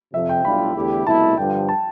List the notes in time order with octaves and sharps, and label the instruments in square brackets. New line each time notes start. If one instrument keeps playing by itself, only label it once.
[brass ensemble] F2 C3 F3 [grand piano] E5
[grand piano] G5
[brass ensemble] B1 A2 G3 D4 F4 [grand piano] B5
[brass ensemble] E2 D3 A3 E4 G4
[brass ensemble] C2 B2 A3 E4 [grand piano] A5
[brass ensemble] G2 D3 F3 [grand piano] G5
[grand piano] A5